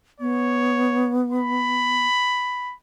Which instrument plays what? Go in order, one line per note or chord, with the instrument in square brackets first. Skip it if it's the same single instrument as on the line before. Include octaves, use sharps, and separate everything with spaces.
[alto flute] B3 [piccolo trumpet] C#5
[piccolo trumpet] B5